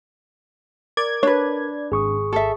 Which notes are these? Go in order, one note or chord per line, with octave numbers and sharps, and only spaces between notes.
A#4 D5 G#6
D4 B4 C#5
G#1 G#4 C#6 D#6
A4 E5